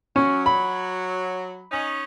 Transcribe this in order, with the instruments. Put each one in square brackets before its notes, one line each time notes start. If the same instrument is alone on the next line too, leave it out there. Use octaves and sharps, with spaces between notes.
[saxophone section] F#3 [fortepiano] C#4
[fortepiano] B5
[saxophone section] C#4 D#4